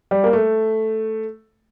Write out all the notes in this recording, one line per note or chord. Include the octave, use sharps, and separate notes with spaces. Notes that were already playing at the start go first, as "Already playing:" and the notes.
G3
A#3
A3